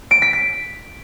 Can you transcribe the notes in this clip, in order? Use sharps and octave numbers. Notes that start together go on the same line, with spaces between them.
D7
B6
B6